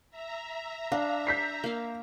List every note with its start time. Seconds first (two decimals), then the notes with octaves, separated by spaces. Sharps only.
0.11 E5 A#5
0.92 D4 F5
1.27 G6 B6 C7
1.64 A#3 F5